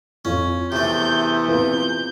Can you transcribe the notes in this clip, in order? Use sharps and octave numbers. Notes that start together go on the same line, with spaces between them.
F2 C#4 F4
E2 C3 A3 C#6 G6
C4 F4 B4 G6